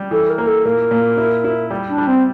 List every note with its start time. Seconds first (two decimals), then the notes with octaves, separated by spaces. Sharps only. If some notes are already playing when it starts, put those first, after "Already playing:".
Already playing: G3
0.11 E3 A4
0.30 A#4
0.38 A#3
0.47 A4
0.65 A#2 A#4
0.91 A#2
1.17 E4
1.44 E4
1.70 G3
1.89 D4
1.98 G3
2.07 C4